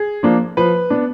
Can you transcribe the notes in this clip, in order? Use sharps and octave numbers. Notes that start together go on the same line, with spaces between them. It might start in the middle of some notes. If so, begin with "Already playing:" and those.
Already playing: G#4
F3 A#3 D4
F3 B4
B3 D4